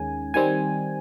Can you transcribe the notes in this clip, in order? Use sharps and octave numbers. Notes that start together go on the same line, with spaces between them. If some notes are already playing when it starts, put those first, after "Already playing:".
Already playing: D#2 D#3 G#3 C#4 G#5
D#3 G3 C4 G#5